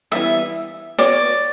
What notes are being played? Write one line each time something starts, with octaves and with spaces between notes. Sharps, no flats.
E3 G3 B3 E4 E5
B3 F#4 C#5 D5